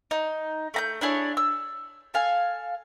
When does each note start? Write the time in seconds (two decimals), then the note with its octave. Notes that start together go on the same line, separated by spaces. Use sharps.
0.11 D#4
0.74 A3 A#5 G6
1.01 D4 E4 G#4 C#5
1.37 E6
2.14 A4 F5 G#5